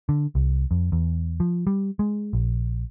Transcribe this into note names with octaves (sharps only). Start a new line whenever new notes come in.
D3
C2
F2
E2
F3
G3
G#3
A#1